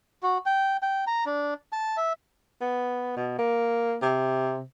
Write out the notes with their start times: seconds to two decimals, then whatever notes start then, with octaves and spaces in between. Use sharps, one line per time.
0.23 F#4
0.46 G5
0.82 G5
1.07 A#5
1.26 D4
1.72 A5
1.97 E5
2.61 B3
3.17 B2
3.39 A#3
4.02 C3